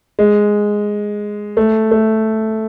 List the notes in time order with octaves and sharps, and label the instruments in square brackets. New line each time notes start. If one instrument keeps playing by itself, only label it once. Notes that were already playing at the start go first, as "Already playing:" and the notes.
[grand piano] G#3
A3
A3